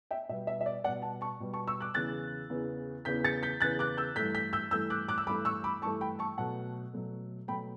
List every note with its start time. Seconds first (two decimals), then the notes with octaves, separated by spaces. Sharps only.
0.11 E5 G5
0.29 B2 G3 B3 E5
0.47 E5
0.61 E5
0.66 D5
0.84 B2 G3 B3 D5 F#5
1.02 F#5 A5
1.21 A5 C#6
1.40 B2 G3 B3
1.54 A5 C#6
1.68 C#6 E6
1.81 D6 F#6
1.94 E2 C#3 E3 B3 F#6 A6
2.50 E2 C#3 E3 B3
3.05 E2 C#3 E3 B3 G6 B6
3.24 A6 C#7
3.43 G6 B6
3.61 E2 C#3 E3 B3 F#6 A6
3.79 D6 F#6
3.97 E6 G6
4.16 G2 E3 A3 G6 B6
4.35 G6 B6
4.53 E6 G6
4.71 G2 E3 A3 E6 G6
4.90 D6 F#6
5.09 D6 F#6
5.18 E6
5.27 G2 E3 A3 B5 D6
5.45 C#6 E6
5.64 B5 D6
5.82 G2 E3 A3 A5 C#6
6.01 G5 B5
6.19 A5 C#6
6.38 B2 F#3 A3 F#5 A5
6.93 B2 F#3 A3
7.48 B2 F#3 A3 G5 B5